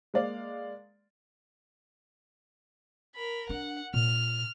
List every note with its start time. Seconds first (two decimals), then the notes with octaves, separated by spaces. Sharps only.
0.14 G#3 A#3 D5 F5
3.15 A#4 B5
3.49 D4 F#5
3.94 A#2 F6